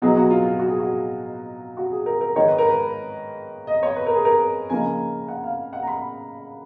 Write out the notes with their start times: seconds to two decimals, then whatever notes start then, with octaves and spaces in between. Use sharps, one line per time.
0.02 B2 F#3 B3 D#4 G#4
0.17 F#4
0.30 F4
0.45 F4
0.59 F#4
0.70 G#4
0.79 F#4
1.77 F#4
1.92 G#4
2.06 A#4
2.21 A#4
2.36 G#2 D#3 G#3 D#4 C#5
2.48 B4
2.58 A#4
2.70 B4
3.67 D#5
3.83 C#5
3.96 B4
4.07 A#4
4.15 G#4
4.25 A#4
4.70 C#3 F3 A#3 D#4 G#5
5.28 F#5
5.44 F5
5.73 F#5
5.83 A#5
5.87 B5